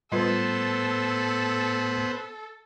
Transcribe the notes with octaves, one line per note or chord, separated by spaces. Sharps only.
A2 G3 B3 F4 A4 B4 C5